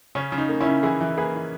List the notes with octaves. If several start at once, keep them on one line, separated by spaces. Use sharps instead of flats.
C#3 C#4
C#3
D#4
A#3
C#4 E4
C#3
E3 E4 G#4
E3
A#3 G#4 B4
E3